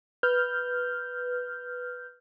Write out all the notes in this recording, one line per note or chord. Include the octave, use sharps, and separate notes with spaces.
B4 F6 G6